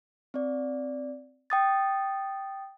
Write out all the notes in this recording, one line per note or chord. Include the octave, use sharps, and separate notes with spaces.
C4 D5
G5 D#6 A6